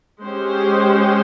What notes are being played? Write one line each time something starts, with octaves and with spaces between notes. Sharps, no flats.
G#3 C#4 G4 C5